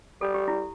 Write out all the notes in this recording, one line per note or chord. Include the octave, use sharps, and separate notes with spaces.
G3 A4
G4
E4